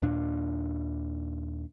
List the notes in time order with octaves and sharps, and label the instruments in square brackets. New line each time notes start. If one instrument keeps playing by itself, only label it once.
[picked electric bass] D#2 A#2 D4